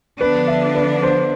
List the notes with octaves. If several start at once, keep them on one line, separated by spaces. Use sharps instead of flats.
D3 F3 B3 D4 B4
E5
B4
C5